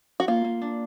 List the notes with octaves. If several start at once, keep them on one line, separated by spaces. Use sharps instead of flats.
F#4
A#3 F4
A#3
D4